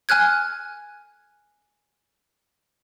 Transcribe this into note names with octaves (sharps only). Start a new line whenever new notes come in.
G#5 F6 F#6 G#6